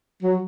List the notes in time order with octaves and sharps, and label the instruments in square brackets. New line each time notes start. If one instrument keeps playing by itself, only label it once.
[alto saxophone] F#3